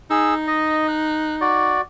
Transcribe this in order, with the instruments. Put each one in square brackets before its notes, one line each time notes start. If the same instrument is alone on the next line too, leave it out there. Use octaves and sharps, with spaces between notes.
[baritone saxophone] D#4 [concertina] G#4 E6
[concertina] D#5
F#6
F#4 D5